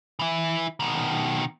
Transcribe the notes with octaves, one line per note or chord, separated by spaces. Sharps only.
E3 E4
B2 D#3